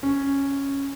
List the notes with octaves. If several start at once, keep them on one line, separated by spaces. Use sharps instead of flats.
C#4